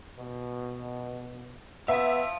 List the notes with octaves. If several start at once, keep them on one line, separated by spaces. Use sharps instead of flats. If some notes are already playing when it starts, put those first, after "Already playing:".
B2
B3 E5 F5 A5